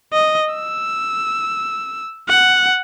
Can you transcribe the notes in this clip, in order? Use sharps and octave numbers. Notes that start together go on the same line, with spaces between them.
D#5
E6
F#5